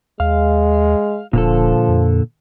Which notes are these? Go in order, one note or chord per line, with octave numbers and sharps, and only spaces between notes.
D#2 G#3 F5
D#1 A#2 D3 F3 A4
F2